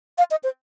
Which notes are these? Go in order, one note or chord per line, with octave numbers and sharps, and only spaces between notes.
F5
D#5
C5